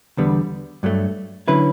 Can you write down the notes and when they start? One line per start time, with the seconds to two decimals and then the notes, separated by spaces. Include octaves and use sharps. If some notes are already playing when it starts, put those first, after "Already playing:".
0.17 E2 D3 G3 B3
0.83 G2 F#3 A3
1.48 D3 F#3 C#4 E4 B4